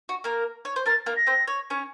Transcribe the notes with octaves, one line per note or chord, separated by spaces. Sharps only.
F#4
A#3 A#4
C#5
C5
A#3 A#4 A6
A#3 A#4
A#6
C4 C5
C#5
C#4 C#5